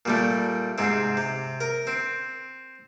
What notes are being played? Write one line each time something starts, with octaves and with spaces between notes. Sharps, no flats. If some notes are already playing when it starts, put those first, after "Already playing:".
A#2 G3 A3
G#2 C3 C4
C3
A#4
C4